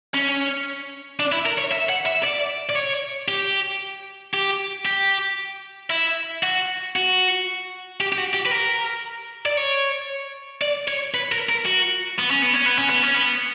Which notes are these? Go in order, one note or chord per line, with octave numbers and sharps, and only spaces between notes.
C#4
D4
E4
A#4
C#5
E5
F#5
E5
D5
D5
C#5
G4
G4
G4
E4
F#4
F#4
G4
G4
F#4
G4
B4
A#4
D5
C#5
D5
C#5
B4
A#4
A#4
F#4
B3
C#4
B3
C#4
B3
C#4
B3
C#4
B3